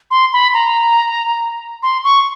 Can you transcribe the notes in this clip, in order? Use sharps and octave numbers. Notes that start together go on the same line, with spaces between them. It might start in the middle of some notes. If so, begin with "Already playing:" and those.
C6
B5
A#5
C6
C#6